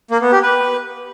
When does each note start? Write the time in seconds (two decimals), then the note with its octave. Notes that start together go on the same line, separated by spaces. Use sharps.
0.11 A#3
0.21 B3
0.32 G4
0.43 B4